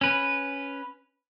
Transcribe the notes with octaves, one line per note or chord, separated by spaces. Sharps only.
C#4 B4